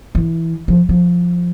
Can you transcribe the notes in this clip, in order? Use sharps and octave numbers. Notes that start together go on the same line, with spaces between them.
E3
F3
F3